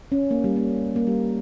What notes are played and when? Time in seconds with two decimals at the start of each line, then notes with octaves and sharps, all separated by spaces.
0.12 C#4
0.31 A#3
0.44 G3
0.56 A#3
0.96 A#3
1.07 G3